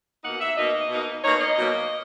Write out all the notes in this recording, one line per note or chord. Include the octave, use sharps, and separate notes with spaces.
B2 A#3 D#4 F#5
E5
B2 A#3 D#4 D#5
B2 A#3 D#4
B2 A#3 D#4 C#5
D#5
B2 F#3 A#3